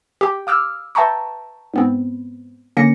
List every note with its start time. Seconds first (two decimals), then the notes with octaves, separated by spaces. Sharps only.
0.21 G4 G5
0.47 F5 D6 E6 F6
0.95 B4 E5 G5 A5 A#5 C#6
1.74 G#2 B3 C4
2.77 D3 A#3 C#4 A#6 C#7